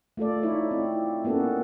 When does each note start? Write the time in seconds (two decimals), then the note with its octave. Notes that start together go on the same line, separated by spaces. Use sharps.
0.17 A3 F4 A4 D5
0.43 D#4 E4 C#5
0.71 C4
1.24 A#3 B3 C#4 F#4 A4